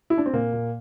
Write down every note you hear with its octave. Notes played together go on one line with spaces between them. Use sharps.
E4
D4
C4
A#2 A#3
A#2